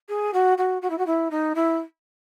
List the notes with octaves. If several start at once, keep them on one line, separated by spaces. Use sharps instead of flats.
G#4
F#4
F#4
F#4
E4
F#4
E4
D#4
E4